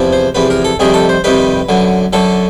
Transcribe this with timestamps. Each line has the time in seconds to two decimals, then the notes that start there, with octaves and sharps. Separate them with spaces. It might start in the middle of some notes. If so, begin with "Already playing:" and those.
Already playing: E2 C3 F3
0.12 C5
0.35 E2 C3 F3 B4
0.50 A#4
0.64 A4
0.79 F2 C3 D#3 G3 G#4
0.94 A4
1.09 C5
1.24 F2 C3 D#3 G3 B4
1.69 F#2 D3 F#3
2.13 F#2 D3 F#3 A4